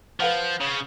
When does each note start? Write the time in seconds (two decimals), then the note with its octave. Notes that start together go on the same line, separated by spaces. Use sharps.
0.20 F3 B4 F5 F#5
0.61 C#3